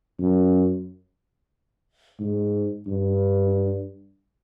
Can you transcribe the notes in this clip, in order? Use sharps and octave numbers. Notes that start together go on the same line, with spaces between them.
F#2
G#2
G2